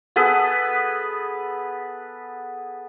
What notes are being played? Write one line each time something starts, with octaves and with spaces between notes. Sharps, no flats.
B3 G#4 A4 B4